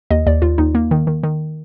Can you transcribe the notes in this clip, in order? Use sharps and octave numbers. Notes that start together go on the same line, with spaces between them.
D#2 D#5
D#2 D5
D#2 F4
D#2 D#4
A#3
D#3
D#3
D#3